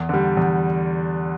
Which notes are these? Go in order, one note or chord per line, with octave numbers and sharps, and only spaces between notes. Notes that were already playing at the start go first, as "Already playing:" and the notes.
Already playing: E2
D3 G3
E2